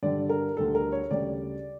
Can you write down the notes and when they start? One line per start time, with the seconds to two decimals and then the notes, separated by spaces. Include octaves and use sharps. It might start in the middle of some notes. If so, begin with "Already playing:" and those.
0.03 G2 D3 G3 D5
0.29 A#4
0.57 D2 D3 G3 D4 A4
0.75 A#4
0.92 C#5
1.11 D2 C#3 G3 D5